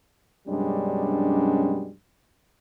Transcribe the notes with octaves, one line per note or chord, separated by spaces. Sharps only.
F#2 B2 G3 G#3 C#4 D4